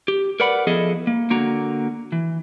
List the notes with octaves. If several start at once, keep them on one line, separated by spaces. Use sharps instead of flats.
G4
A#4 B4 D5 F#5 B5
F3 B3 E4 G#4 A4 D#5
A#3
D3 A#3 F#4 A#5
E3